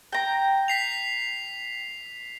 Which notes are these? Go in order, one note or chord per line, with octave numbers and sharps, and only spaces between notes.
G5 A#5
B6 C7 F7